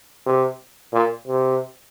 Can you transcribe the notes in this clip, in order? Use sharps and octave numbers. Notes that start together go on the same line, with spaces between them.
C3
A#2
C3